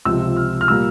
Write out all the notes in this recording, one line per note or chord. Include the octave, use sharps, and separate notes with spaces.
C#2 C3 F3 E6
F6
F6
A#2 G3 A#3 E6